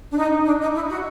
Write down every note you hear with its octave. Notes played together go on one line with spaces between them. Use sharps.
D4
D#4
D4
D#4
E4
F#4